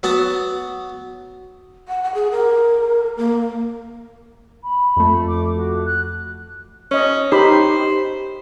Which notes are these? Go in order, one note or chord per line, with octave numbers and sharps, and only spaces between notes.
F#3 B3 F#5 A5
F#5
F#5
G#4
A#4
A#3
B5
F2 A3
D6
F#4
F#6
C#4 C#5 D#5
D#4 G4 C5 B5